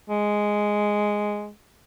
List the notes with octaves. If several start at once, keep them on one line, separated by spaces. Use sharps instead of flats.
G#3